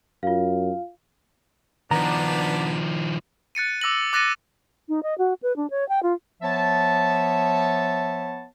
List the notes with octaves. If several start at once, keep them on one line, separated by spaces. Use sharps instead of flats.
F#2 F4 F5
D#3 F3 B3 D4 A#5
F#6 A6 C#7 D#7
D6 E6 A#6 F#7
D6 F#6 A6 A#6 C#7 D#7
D#4
D#5
F#4
B4
D4
C#5
G5
F4
F3 B3 C#5 E5 A5